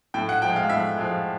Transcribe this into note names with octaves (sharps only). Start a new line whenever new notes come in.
A2 G5
F#5
F3 G#3 G5
F5
A2 E5
F3 G#3